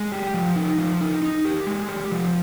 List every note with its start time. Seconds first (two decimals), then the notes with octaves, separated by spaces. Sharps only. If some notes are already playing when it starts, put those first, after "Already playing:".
Already playing: G#3
0.12 G4
0.34 F3
0.56 D#4
0.78 F3
1.01 D#4
1.22 D#4
1.45 G4
1.67 G#3
1.89 G4
2.12 F3